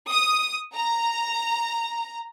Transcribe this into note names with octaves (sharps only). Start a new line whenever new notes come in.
D#6
A#5